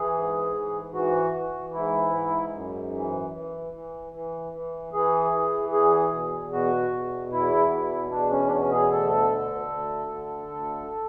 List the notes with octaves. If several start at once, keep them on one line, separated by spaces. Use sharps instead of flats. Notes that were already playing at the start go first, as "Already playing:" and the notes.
Already playing: E3 G#4
G#2
E3
E3 F#4
E3
G#2 E4
G#2
F#2
E3
E3
E3
E3
E3
E3 G#4
E3
E2 G#4
B2
B2 F#4
E2
E2 E4
B2
E2 D4
C#4
D4
B2 C#4
G#4
D2 A4
D3
D2
D3
D2